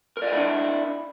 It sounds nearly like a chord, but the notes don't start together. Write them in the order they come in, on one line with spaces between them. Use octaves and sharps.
A#4 D5 D#5 E4 D4